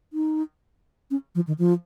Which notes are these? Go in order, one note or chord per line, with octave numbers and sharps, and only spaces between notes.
D#4
C#4
F3
D#3
F3